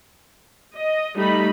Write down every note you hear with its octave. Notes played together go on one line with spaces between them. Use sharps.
D#5
G3 A3 D#4 B5